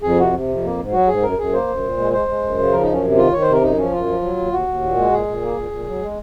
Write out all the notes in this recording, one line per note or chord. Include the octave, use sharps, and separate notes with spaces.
F2 G#4
C3 F#4
C3
F2
A#3
G#2
F#3 F#4
G#2 G#4
F#2 A#4
F#2 G#4
A#3 C5
F#2
A#2
G#3
G#3 C5
G#3
F#2
C#3
F3 A#4
F#2 D#4
C#4
C3
D#3 F4
D#3 C#5
C5
C3 A#4
F#2 D#4
F3 C#4
F#2 F4
F3
F#3
D#2
D#2 F#4
D#2
A#2
G#3
A#2 G#4
A#2
A#3
A#2
A#2
F#3
G#3